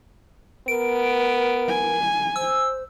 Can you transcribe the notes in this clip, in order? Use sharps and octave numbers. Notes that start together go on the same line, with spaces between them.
B3 A#4 D7
G#5
C5 E6